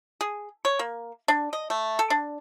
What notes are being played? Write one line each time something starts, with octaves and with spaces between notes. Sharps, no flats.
G#4
C#5
A#3
D4
D#5
A3
A4
D4